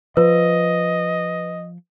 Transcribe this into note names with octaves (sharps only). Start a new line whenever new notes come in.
F3 B4 D#5